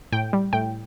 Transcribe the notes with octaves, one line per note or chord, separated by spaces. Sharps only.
A2 G5
G3
A2 G5